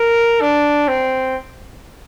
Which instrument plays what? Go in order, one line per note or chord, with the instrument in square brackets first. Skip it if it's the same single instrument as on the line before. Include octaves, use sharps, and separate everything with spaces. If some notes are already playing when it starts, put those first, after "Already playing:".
Already playing: [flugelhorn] A#4
D4
C4